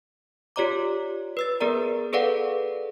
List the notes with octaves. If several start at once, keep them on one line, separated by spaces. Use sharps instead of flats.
F4 G4 C#5 D5 A#5 D6
B4 E6 A6
B3 G#4 A#4 D5 A#5
G#4 A4 B4 D5 F5 F#5